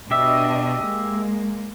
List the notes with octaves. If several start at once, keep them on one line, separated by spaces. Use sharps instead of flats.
B2 D4 G4 D#5 E5
G#3 A#3